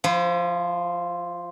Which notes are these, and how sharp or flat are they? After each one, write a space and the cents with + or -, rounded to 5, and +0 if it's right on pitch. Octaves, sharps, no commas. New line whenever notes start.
F3 +0 E4 +40